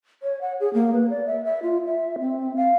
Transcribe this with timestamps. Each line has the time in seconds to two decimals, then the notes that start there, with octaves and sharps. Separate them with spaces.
0.23 C#5
0.41 F#5
0.60 G#4
0.74 A#3
0.93 B4
1.10 D5
1.26 E5
1.45 E5
1.63 F4
1.86 E5
2.19 C4
2.57 F5